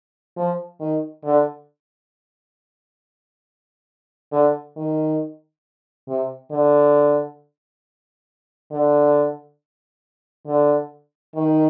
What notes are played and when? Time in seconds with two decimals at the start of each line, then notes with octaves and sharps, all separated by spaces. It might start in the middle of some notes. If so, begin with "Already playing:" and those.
0.37 F3
0.80 D#3
1.24 D3
4.32 D3
4.76 D#3
6.08 C3
6.51 D3
8.72 D3
10.47 D3
11.36 D#3